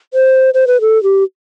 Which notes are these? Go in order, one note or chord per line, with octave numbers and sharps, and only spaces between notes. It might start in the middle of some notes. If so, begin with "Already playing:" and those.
C5
C5
B4
A4
G4